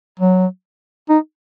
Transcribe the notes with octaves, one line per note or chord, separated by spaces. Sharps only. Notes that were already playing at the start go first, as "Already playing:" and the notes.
F#3
D#4